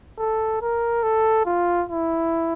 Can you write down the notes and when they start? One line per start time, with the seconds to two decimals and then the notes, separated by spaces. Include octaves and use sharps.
0.19 A4
0.61 A#4
1.03 A4
1.45 F4
1.89 E4